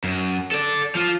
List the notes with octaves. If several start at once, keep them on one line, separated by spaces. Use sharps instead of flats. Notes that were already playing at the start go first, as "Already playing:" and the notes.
F#2
A4 D5
F3 F4